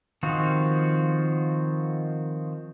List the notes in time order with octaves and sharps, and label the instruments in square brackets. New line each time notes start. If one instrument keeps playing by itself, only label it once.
[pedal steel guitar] D#3 F3 C4 F4 F#4